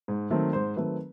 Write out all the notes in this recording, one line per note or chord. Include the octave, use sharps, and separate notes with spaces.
G#2
D#3 F#3 A3 C4
G#2 C5
D#3 F#3 A3 C4 B4